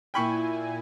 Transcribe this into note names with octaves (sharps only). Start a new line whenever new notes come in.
A#2 E4 G5 G#5 B5 C#6